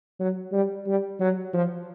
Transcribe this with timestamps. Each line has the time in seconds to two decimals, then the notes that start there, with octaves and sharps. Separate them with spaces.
0.19 F#3
0.52 G3
0.86 G3
1.20 F#3
1.53 F3